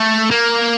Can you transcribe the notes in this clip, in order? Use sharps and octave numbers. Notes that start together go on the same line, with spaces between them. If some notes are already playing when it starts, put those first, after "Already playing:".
Already playing: A3
A#3